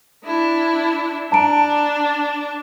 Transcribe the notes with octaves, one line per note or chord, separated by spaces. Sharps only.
D4 E4
D4 A5 A#5 D7